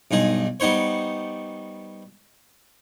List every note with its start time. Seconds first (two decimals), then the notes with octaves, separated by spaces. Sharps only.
0.11 B1 G2 D#4 G#4
0.60 G3 B3 D#4 C5 C#5